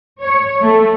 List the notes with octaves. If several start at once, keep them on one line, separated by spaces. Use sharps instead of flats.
C#5
A3